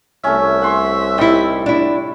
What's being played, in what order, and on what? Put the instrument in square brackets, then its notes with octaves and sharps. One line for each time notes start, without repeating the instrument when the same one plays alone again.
[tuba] C2 [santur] A3 C#4 [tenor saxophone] E5
[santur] F#5 C6 C#6
[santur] G3 [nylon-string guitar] D#4 E4
[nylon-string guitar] D4 E4